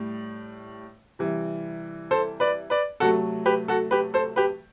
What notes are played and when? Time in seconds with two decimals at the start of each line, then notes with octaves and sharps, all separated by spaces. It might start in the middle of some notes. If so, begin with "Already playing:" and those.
Already playing: A2 G3
1.19 C3 E3 G3
2.11 A4 C5
2.40 B4 D5
2.70 B4 D5
3.00 C3 F#3 A3 F#4 A4
3.46 G4 B4
3.68 F#4 A4
3.91 G4 B4
4.14 A4 C5
4.36 G4 B4